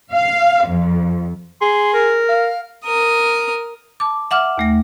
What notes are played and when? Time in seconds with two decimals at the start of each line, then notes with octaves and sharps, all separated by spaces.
0.13 F5
0.68 F2
1.61 G#4 C6
1.94 A#4
2.29 F5
2.85 A#4 D#6
4.00 A5 D6
4.31 E5 F#5 D6 F6
4.57 D#2 A3 A#6